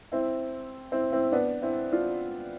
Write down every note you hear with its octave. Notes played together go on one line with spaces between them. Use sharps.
C4 E4
C4 E4
C4 E4
B3 D4
C4 E4
D4 F4